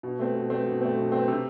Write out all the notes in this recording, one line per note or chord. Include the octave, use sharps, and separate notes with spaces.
B2
A3 C4
B2
A3 C4
B2
A3 C4
B2
A3 C4
C3